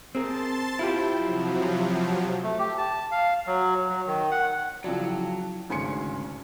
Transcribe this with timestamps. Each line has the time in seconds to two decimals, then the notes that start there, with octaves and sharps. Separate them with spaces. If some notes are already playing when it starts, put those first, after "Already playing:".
0.15 C4 G#4 A#4 A5 C6 A6
0.79 E4 F4 G4 C5 G5
1.14 C3 F3 F#3
2.43 A3
2.59 G4
2.78 A5
3.11 F5
3.47 F#3
3.89 F#3
4.07 D#3
4.31 F#5
4.84 C#3 F3 F#3 E4 D5 G5 A5
5.69 G#1 D2 C#3 G#5 C6 C#7